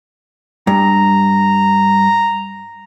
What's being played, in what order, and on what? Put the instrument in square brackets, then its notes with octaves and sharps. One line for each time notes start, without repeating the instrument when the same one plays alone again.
[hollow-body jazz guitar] G2 [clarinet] A#5